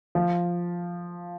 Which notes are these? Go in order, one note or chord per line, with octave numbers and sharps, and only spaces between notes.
F3